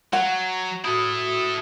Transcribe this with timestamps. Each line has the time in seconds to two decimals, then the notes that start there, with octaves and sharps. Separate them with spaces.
0.13 F#3 F#5
0.84 E4 F#4 A4 D#6